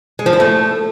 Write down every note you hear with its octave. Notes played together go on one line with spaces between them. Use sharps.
G#3
F3
E4
A3